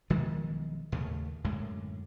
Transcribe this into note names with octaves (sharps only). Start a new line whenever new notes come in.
B1 D#3 F3 G#3
D#2 A2 C#3 A3
F#2 A2 D3 G#3